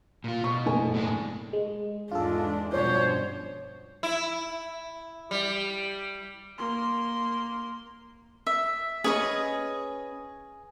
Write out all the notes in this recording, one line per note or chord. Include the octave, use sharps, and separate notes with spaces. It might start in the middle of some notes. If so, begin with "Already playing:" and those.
A#2 F4
B2 C#6
F#1 A3 G#5
A2 G#3 D4
G#3
E2 G#2 D4 F4 A4
G2 B2 F3 C#4 D4 C5 C#5
E4
G3
A#3 C6
E5
C#4 G#4 B4 C#5 D#5